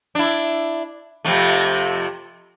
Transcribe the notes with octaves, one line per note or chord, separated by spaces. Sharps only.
D4 E4
F2 C3 A3